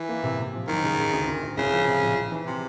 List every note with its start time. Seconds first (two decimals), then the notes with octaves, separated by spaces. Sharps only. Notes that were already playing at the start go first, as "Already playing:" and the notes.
Already playing: E3
0.09 A#3
0.23 C3
0.39 C3
0.54 F3
0.68 F#1 D#3
0.83 C#3
0.98 C#3
1.13 D2
1.27 D2
1.43 D2
1.57 C2 C#3
1.73 F3
1.87 C3
2.02 A#1
2.17 A#1
2.32 E3
2.47 C3